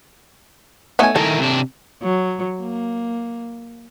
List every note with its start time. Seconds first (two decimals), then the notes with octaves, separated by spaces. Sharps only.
0.99 A3 B3 C#4 D#4 G#5
1.16 D#3 E4 A4 A#4
1.40 C3 D4
2.03 F#3
2.61 A#3